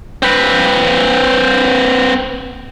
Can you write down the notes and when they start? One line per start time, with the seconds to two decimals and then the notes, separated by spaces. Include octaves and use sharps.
0.22 C4 B4